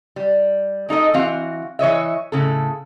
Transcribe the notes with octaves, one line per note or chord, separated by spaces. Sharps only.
G3
G#3 D#4 A4 D#5
E3 C4 F#4 F5
E3 C#5 D#5 E5
A2 C#3 A4